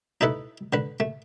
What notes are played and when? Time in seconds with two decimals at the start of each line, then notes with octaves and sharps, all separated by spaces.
0.21 D#4 E4 A4 B4
0.73 D3 B4
1.00 A3